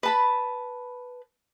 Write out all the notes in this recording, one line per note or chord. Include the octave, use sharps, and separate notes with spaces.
B4 A5 B5